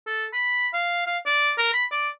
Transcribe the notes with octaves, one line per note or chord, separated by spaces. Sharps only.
A4
B5
F5
F5
D5
A#4
B5
D5